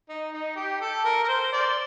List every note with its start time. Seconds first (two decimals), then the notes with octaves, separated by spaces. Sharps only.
0.09 D#4
0.33 D#4
0.56 G4
0.81 A4
1.05 A#4
1.24 A#4
1.28 C5
1.53 D5